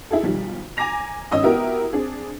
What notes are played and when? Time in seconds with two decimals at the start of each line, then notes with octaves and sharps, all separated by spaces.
0.11 D#4 E4 G#4 A4
0.23 B1 D#3 F3 G3
0.77 G#5 A#5 D6 A#6 F7
1.31 G#1 C#4 D#5 D#6 E6
1.43 B3 E4 F#4 G4 A#4
1.93 C4 D4 G#4